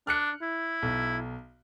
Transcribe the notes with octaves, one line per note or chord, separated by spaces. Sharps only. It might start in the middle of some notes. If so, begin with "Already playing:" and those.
D4 F6 F#6 C#7
E4
B1